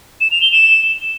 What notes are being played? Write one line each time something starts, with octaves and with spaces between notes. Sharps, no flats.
E7
F7
G7
E7